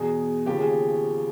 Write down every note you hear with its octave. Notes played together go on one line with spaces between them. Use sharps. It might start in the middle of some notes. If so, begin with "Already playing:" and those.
Already playing: E2 B2 G#4
D#2 C#3 F3 G4
G#4